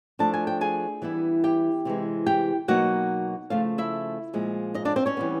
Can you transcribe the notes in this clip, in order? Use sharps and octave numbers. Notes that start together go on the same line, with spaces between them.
F3 A3 D4 A5
G#5
G5
G#4 G#5
E3 G3 B3 E4
G4 G5
C3 E3 G#3
G4 G5
B2 F#3 A#3 D#4 F#4 F#5
C#3 F3 A3 F4 F5
E4 E5
A#2 F3 G#3
D#4 D#5
D4 D5
C4 C5
C#4 C#5
E3 G3 B3